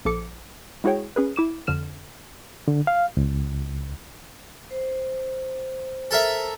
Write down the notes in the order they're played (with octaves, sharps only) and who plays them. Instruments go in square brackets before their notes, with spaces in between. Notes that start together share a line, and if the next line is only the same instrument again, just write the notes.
[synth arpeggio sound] A#1 F3 A4 D6 C#7
G#3 E4 F#4 G#4 C#5 G5
C#4 G#4 B4
E4 D6 E7
F2 D3 F6 E7
[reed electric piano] D3
F5
C#2
[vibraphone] C5
[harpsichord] A4 A#4 E5